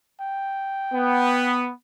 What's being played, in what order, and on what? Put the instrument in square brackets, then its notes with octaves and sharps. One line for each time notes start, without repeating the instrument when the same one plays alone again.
[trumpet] G5
[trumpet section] B3